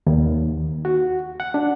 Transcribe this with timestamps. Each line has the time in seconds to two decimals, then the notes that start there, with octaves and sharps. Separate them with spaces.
0.07 D#2
0.85 F#4
1.40 F#5
1.54 D4